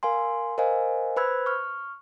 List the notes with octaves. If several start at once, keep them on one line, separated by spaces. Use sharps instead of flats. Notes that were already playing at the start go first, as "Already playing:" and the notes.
A#4 F5 G#5 C6
A#4 C5 D#5 F5 G#5
B4 C5 B5 E6 F#6 G#6
C#6 F6